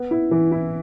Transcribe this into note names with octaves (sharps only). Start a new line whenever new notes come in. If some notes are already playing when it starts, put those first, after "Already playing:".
Already playing: B3
E4
E3
E4